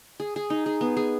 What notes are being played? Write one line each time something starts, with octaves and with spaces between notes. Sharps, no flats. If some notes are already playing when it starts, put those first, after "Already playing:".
G#4
G#4
D#4
G#4
B3
G#4